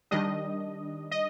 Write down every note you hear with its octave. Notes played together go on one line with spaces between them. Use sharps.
D#3 G3 D4 D#5
D#5